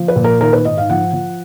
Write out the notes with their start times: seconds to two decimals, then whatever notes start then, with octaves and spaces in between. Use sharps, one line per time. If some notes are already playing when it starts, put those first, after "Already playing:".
Already playing: F3
0.08 B4
0.16 A#2
0.24 A#4
0.41 D#3 A#4
0.53 B4
0.65 G#2 D#5
0.78 F5
0.90 F3 F#5
1.13 F3